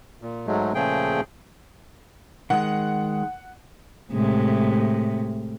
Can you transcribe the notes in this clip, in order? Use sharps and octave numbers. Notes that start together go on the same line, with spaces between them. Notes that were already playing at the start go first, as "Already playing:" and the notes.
A#2
G#2 F#3 G#3 A3
A#2 C#3 F3 A3 G#4 G5
D#3 G#3 F#5
A2 C3 G#3